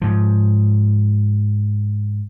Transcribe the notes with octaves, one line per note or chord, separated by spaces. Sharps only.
G#2 F3